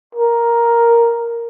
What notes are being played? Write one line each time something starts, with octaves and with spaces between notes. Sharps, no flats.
A#4